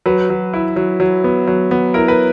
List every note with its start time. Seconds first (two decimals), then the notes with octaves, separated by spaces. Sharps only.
0.06 F#3 B4
0.30 F#3
0.54 E4
0.76 F#3
1.00 F#3
1.24 B3
1.47 F#3
1.71 B3
1.94 E4 A#4
2.08 B4